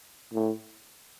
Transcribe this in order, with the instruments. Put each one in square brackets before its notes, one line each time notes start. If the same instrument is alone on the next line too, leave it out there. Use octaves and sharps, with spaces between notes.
[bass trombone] A2